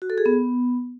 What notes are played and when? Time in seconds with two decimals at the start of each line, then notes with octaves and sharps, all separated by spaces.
0.02 F#4
0.10 A4
0.18 G#4
0.26 B3